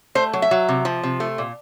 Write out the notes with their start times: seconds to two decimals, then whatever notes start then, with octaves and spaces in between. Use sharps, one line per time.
0.15 A3 C5
0.33 F#3
0.42 E5
0.51 F#3
0.69 C3
0.85 F3
1.03 C3
1.20 A3
1.38 A#2